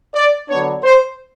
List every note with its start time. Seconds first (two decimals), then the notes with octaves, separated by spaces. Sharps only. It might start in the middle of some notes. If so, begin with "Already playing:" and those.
0.14 D5
0.49 D3 F#3 B3 D4 C#5
0.84 C5